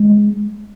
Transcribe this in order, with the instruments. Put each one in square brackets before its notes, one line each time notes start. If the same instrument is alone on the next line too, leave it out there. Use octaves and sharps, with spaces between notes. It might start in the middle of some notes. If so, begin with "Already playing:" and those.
Already playing: [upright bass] G#3